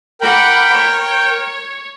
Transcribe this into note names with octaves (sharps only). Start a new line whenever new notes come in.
A#4 F#5 G5 B5 D6
C#5